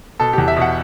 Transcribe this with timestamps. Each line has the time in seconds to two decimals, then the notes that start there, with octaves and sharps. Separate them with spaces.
0.20 B2 A4
0.33 E2 G4
0.48 E5
0.57 B2
0.62 F#5